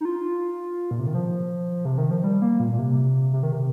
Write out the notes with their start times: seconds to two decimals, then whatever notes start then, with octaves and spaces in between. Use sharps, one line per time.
0.01 D#4
0.05 F4
0.91 A#2
0.99 C3
1.07 D#3
1.14 F3
1.85 C3
1.98 D#3
2.11 F3
2.24 G3
2.42 A#3
2.60 A#2
2.72 A#2
2.78 C3
3.33 C3
3.43 D#3
3.52 C3